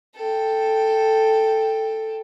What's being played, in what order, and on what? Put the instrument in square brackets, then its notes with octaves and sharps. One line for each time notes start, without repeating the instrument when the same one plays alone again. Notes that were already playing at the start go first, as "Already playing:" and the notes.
[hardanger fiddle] A4 G5